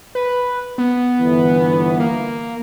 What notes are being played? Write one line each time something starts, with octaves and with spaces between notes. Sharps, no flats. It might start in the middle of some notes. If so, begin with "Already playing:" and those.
B4
B3
G1 E3
A#3